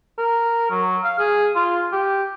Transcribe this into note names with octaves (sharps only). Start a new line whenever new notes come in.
A#4
F#3
F5
G#4
F4
G4